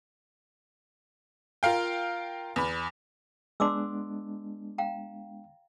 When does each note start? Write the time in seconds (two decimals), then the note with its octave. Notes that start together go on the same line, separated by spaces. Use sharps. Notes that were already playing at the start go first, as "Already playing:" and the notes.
1.63 F4 A#4 F5 G5
2.56 E2 B5
3.60 G#3 B3 D4 C6 D6 E6
4.78 F5 G5 A#5